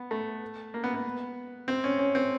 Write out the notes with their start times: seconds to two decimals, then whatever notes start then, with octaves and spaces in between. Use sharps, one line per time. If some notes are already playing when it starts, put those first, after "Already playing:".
Already playing: B3
0.11 A3
0.74 A#3
0.84 B3
0.95 B3
1.68 C4
1.84 C#4
1.99 C#4
2.15 C4